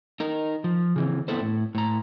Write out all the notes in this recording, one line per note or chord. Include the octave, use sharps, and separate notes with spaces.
D#4 A#4
F3
C#3 E3 C4
B3 C4 D4 E4 A4 C5
A2
A2 A#5